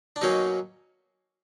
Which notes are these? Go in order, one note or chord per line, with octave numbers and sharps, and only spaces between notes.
D4
B2 F#3 A#3 C#4 D#4